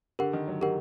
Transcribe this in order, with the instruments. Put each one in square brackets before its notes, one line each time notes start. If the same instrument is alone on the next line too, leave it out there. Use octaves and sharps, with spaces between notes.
[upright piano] D3 [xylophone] G4 A#4 F#5
[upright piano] D#3
F#3
[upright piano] D#3 [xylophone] G4 A#4 F#5